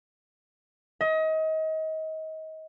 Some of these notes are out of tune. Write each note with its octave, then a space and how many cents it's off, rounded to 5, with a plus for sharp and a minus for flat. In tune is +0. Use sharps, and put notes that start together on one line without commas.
D#5 +30